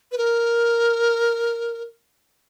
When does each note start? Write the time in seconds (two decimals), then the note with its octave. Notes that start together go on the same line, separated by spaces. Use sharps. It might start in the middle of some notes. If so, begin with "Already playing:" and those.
0.12 B4
0.18 A#4